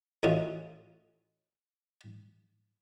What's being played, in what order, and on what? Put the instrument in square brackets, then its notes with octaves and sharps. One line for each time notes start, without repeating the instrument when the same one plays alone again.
[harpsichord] A1 A2 C#4 F4 F#4 D#5